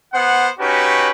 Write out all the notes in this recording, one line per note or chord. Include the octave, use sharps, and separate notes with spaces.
B3 C5 F#5
C#4 D#4 F#4 G4 B4